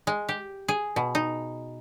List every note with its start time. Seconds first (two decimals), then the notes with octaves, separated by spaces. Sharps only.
0.07 G#3
0.29 G4
0.68 G#4
0.96 B2
1.15 D#4